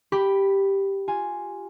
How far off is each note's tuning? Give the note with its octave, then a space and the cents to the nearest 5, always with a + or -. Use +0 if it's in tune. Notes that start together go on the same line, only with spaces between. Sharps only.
G4 +0 B5 +0
F4 +5 G#5 +0